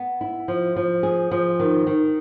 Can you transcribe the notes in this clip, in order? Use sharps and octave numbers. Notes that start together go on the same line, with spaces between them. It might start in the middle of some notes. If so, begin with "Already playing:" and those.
Already playing: B3
E4
F3
F3
G#4
F3
D#3
D#3